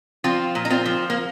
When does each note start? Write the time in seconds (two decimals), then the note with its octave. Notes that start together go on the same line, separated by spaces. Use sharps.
0.24 F3 C4 F4
0.55 A#2
0.65 D#4
0.70 C4 F4
0.85 F3
1.10 A#3